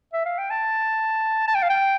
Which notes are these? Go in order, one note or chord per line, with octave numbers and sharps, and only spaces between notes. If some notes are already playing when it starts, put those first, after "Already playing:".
E5
F5
G5
A5
A5
G5
F5
G5